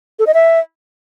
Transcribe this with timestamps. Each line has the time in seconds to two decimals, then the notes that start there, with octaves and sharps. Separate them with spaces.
0.19 A4
0.27 D#5
0.34 E5